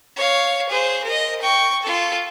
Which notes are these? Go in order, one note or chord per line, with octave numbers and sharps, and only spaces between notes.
C#5 F5
G#4 C5
A#4 D#5
G5 C#6
F4 A4